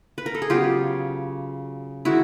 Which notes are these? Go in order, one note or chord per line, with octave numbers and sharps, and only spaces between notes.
B4
A#4
A4
G#4
C#3 F#3 B3 F4 G4
D#3 G#3 E4 F#4